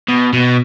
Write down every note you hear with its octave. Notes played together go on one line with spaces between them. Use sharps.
B2
B2